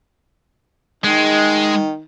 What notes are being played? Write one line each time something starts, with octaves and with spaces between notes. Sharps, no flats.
D#3 G#3